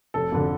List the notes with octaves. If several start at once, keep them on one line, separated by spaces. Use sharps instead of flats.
F1 A4
F2 D3